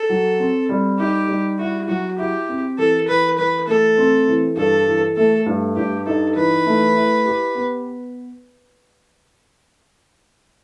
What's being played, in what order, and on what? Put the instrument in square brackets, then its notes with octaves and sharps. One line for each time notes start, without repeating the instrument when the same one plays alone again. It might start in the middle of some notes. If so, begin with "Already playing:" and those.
Already playing: [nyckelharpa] A4
[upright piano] F#3
C4
G3
[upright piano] D#4 [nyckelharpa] G4
[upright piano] G3
[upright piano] E4 [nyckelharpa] F#4
[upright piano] F#3 [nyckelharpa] F#4
[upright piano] E4 [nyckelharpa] G4
[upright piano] C4
[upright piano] E3 [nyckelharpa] A4
[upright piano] E3 [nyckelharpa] B4
[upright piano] E3 [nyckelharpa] B4
[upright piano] A3 [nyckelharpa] A4
[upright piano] C4
E3
[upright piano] G2 [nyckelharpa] A4
[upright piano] E3
[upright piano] A3 [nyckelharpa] A4
[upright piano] G2
[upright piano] G2 [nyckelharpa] G4
[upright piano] D#4 [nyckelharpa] A4
[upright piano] E3 [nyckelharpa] B4
[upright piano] A3
E4
G4
B3